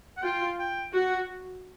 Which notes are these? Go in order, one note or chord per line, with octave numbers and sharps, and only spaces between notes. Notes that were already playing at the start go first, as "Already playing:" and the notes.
F#5
F4 G5
G5
F#4 F#5